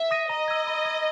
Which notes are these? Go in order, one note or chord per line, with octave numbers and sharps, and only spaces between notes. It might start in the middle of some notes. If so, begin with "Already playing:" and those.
Already playing: E5
D#6 A#6 D#7
D#5 A#5
E6 G#6
B5
D#6 G#6